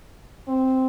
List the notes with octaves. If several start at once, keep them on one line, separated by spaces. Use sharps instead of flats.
C4